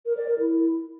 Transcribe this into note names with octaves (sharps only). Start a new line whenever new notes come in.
A#4
D5
A#4
E4